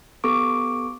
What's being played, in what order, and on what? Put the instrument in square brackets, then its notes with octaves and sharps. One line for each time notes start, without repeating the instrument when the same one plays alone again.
[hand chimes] B3 G4 A4 C#6 D6 D7